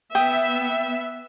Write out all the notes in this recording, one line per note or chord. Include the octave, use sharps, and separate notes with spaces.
B3 E5 G5 D#6